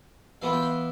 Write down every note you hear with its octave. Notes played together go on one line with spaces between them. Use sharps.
E3 B3 F4 F5
G5
F5